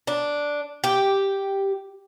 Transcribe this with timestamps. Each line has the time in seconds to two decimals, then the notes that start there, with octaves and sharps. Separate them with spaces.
0.07 D4
0.84 G4